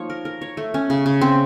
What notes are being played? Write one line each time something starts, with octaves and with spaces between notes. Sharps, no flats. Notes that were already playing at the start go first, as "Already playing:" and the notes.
Already playing: F3 A#3 D#4 C#5
A#4
A#4
C#5
A3
C#4
C#3
C#3
C4